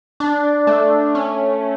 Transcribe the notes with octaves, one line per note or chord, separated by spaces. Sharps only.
D4
A3
C#4